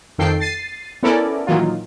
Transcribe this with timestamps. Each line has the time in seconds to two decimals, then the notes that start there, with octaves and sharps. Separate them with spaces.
0.18 F2 D#3 A4 G5 C7
0.40 A6 C7 D#7
1.03 B3 C#4 E4 A4 A#4 D5
1.47 A#2 D#3 E3 F#3 F4